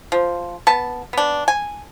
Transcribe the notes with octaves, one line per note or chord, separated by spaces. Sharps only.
F3
B3 A5
B3 D4
G#5